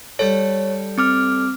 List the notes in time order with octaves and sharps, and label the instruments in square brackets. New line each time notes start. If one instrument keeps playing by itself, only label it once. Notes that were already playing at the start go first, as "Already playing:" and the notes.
[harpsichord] G3 A4 [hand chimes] C#5
[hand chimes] C4 D6 F6